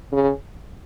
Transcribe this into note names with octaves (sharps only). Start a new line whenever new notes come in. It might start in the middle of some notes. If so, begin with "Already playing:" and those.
C#3